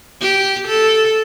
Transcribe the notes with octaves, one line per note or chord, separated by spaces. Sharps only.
G4
A4